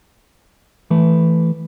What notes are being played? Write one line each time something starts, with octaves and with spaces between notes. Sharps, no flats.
E3 A3 B4